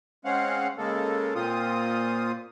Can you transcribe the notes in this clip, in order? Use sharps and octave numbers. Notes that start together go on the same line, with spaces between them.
G#3 C4 C#4 F5 F#5
C#3 G#3 A#3 A4
A#2 A#3 C4 F4 D#6